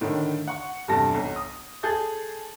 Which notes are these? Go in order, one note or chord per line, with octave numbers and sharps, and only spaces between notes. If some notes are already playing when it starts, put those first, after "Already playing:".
A2 D3 D#3
F#5 C#6
E2 G2 C3 A4 A5 A#6
B1
D#6
G#4 A4 G6 A6